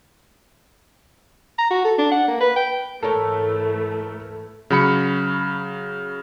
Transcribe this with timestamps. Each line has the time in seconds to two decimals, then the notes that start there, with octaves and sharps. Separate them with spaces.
1.58 A#5
1.70 F#4
1.84 A4
1.98 D4
2.11 F#5
2.28 A#3
2.40 B4
2.56 G5
3.03 G#2 E3 A3 A4 A#4 C#5
4.70 C#3 F#3 B5 C#7